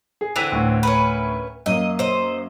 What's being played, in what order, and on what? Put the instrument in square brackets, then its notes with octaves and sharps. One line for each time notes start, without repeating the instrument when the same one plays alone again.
[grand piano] G#4
[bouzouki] D3 E3 C4 [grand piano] B6 E7 F7
[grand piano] D2 A2
[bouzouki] C#4 A#4 B4
[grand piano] F#2 A#3 [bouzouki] D#5
[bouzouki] C5 D#5